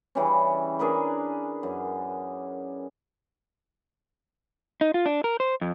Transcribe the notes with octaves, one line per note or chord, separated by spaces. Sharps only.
C#3 E3 G3 C#4
D4 G#4 A#4 B4
F#2
D#4
F4
D4
A#4
C5
F2